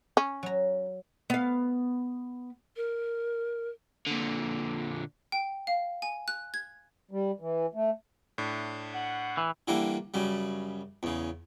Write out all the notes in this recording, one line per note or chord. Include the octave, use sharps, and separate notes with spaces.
C#4
F#3 A#5
B3 F5
A#4
A#2 D3
G5
F5
G#5
F#6
G#6
G3
E3
A3
A2 D4
F#5
E3
D3 E3 G3 A#3
F#2 C#3 G3
E2 C#3